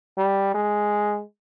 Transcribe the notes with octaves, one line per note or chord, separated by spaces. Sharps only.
G3
G#3